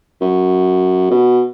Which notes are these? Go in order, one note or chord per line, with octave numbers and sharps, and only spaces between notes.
F#2
B2